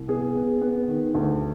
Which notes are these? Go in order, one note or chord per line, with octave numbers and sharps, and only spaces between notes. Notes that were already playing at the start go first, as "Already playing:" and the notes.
Already playing: C2
B3 G#4
B3
B3
D#3
D2